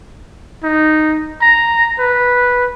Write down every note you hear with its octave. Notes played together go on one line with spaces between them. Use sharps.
D#4
A#5
B4